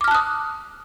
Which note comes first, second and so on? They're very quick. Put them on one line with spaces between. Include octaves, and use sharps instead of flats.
D6 F6 A5 F#6 D#6